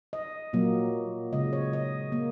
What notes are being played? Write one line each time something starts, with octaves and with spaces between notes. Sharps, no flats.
D#5
A#2 F#3 A#3
C#3 G#3 D#5
C#5
D#5
A#3